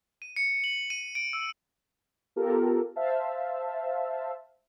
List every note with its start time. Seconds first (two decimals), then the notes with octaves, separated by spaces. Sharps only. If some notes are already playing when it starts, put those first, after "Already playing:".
0.22 D#7
0.36 C#7
0.64 F#7
0.90 D#7
1.15 D7
1.33 E6
2.36 B3 F4 G4 A4 A#4
2.96 C5 E5 F5 A5